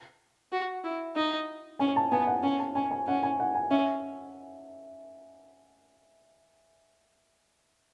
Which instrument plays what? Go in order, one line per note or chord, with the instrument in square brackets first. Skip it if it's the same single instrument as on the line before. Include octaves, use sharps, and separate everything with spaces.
[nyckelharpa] F#4
E4
D#4
[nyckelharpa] C#4 [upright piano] G#5
[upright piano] A5
[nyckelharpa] B3 [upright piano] G#5
[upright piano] F#5
[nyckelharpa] C#4 [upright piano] G#5
[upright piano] A5
[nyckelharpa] C#4 [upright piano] G#5
[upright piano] G#5
[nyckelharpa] C#4 [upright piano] F#5
[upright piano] G#5
F#5
G#5
[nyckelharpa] C#4 [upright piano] E5